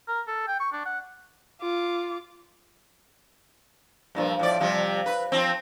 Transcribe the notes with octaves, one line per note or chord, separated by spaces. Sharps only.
A#4
A4
G5
C#6
D4
F#5
F4 D6
G2 A#2 F3
A2 F3 D5
C3 F3 G3
B4
F3 C4